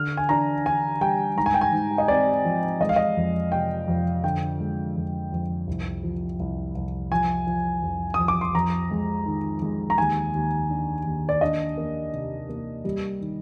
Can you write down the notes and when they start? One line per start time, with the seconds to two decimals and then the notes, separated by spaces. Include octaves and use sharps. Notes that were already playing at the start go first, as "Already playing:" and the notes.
Already playing: D3 F6
0.17 G#5
0.29 D4 A#5
0.65 D4 G#5
1.01 G3 G5
1.37 G#2 A#5
1.46 G#5
1.54 G5
1.61 G#5
1.73 G#2
1.98 D#5
2.08 C4 D5
2.45 F3
2.80 G#3 D#5
2.89 F5
2.96 D#5
3.17 F2
3.52 C3 G5
3.88 F2
4.24 D3 G5
4.60 G#3
4.96 F2
5.32 F2
5.67 C2
6.03 F3
6.40 C2
6.75 C2
7.12 F3 G#5
7.47 F3
7.82 F2
8.14 F2 D#6
8.28 D6
8.41 C6
8.55 F2 A#5
8.91 G#3
9.26 D#3
9.62 G#3
9.90 A#5
9.98 D#2 G#5
10.34 D#2
10.70 D4
11.06 D#2
11.29 D5
11.41 D4 D#5
11.77 A#3
12.13 C3
12.49 A#3
12.85 G3
13.21 D#3